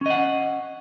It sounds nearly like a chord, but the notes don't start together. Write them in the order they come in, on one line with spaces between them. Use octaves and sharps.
C#4 D#5 F#5